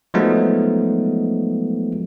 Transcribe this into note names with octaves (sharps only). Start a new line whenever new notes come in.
F3 F#3 G#3 A3 B3 D#4